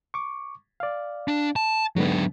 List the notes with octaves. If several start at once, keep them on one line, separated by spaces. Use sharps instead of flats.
C#6 D6
D5 F5
D4
A5
G#2 D3 F#3 B3 D4